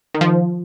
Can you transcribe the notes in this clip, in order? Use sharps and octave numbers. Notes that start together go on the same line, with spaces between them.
D#3
F3